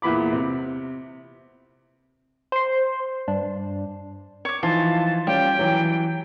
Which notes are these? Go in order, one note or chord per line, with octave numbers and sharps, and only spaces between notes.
E2 A#2 E3 B3 B5 D6
C3
C5 C6
G2 D4
C#5 D6
E3 F3 D#4 F4 A5
G3 C#4 F4 G4 G5
E3 F#3